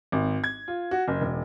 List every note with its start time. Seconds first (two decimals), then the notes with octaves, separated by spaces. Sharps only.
0.12 G#1
0.44 G#6
0.68 F4
0.91 F#4
1.08 F#1
1.21 E1